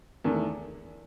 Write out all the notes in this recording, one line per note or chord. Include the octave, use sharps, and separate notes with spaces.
E2 D#3 A3